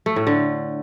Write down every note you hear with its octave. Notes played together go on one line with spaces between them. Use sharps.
A3
A2
D3